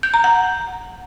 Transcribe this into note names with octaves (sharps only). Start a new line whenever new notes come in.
G6
A#5
F#5